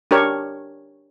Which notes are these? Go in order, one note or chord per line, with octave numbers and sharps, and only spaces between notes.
D4 G4 A#4 C#5